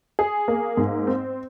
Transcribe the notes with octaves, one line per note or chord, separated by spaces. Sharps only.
G#4
A#3
G#2
C4